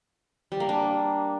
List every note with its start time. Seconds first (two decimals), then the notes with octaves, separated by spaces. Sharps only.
0.52 G3
0.60 A#3
0.69 D4